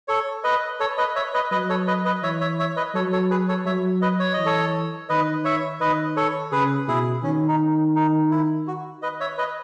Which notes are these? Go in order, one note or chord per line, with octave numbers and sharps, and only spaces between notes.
A4 C#5
B4 D#5
A4 C#5
B4 D#5
C#5 E5
B4 D#5
F#3 B4 D#5
A4 C#5
B4 D#5
B4 D#5
E3 C#5 E5
C#5 E5
C#5 E5
B4 D#5
F#3 A4 C#5
A4 C#5
G#4 B4
A4 C#5
F#3 C#5 E5
B4 D#5
C#5
E3 D#5
A4 C#5
D#3 B4 D#5
C#5 E5
D#3 B4 D#5
A4 C#5
C#3 G#4 B4
B2 E4 G#4
D#3 C#4
D#4
D#4
E4
F#4
B4 D#5
C#5 E5
B4 D#5